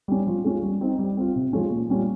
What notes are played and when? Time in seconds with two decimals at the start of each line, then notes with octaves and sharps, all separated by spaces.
0.08 G3 C#4
0.27 F3
0.44 G#3 C#4 F4
0.62 G3
0.81 C4 D#4
0.99 G3
1.17 C4 F4
1.36 C3
1.53 F3 G#3 C#4
1.71 A#2
1.90 G3 C#4 F4